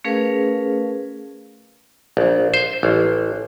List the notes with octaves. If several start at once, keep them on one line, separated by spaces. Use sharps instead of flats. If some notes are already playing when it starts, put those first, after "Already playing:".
A3 C#4 G#4 A#4 B4 F5
A#1
C5
A1